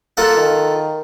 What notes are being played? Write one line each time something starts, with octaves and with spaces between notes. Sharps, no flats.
A#3 F4 A4 F#5
D#3